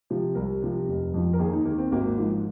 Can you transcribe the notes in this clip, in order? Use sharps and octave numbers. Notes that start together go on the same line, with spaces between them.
C3 F3
C2 A#4
C3 F3
F1
F2 F3
A#4
D#2 G#4
D#4
D#3 A#3
C4
G#1 A#3
G#2 F3